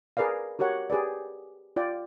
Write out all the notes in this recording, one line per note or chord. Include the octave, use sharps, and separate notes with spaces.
G#4 A#4 B4 D5 F5
F#4 G4 A#4 C#5 F#5
G4 G#4 B4 D5
F4 D5 G5